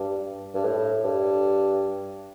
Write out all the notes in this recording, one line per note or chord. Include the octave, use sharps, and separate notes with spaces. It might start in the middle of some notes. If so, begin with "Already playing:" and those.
Already playing: G2
G2
A2
G2